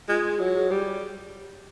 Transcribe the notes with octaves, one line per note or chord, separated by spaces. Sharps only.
G#3 F4
F#3 F#4
G#4
G3 G4